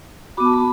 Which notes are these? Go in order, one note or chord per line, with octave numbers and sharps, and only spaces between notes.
B3 F#4 B5 D6
A5
B5